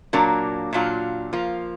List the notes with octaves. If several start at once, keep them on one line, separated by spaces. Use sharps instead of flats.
A#2 F#3 A#3 D4
A#2 F#3 D4 F4
F3 A#3 F4